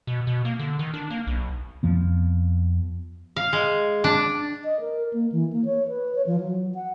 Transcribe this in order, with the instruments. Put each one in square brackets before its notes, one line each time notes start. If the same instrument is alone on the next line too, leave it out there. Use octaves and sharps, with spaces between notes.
[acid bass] B2
B2
A#3
D3
D#3
D4
A#3
B1
[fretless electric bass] F2 F3 B3
[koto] F5
G#3
D4
[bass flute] D#5
A#4
A#3
E3
A#3
C#5
B4
C#5
F3
F#3
F#5